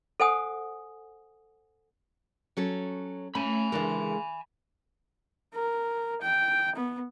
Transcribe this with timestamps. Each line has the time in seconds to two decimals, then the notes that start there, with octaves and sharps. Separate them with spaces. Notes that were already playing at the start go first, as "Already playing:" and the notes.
0.20 A4 C5 F#5 G#5 D#6
2.57 F#3 C#4 A4
3.35 A3 C#4 G#5 B5
3.72 C#3 E3 G#3 D4 A4 A#4
5.54 A#4
6.22 G5
6.76 B3